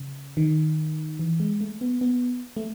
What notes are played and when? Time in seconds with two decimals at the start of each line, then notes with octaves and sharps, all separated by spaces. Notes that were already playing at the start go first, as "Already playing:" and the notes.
Already playing: C#3
0.37 D#3
1.19 E3
1.40 G#3
1.61 A3
1.81 B3
2.01 B3
2.57 A3